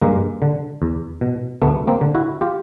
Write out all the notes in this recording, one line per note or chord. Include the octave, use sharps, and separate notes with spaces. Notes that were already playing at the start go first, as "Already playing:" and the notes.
G2 G#3 A#3
D3
E2
B2
D2 A3 B3
A#3 C4
D3
E4 F#4
F4 G4